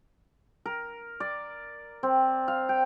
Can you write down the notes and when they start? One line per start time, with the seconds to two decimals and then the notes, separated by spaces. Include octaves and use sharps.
0.66 A#4
1.20 D5
2.03 C4
2.48 F5
2.69 G5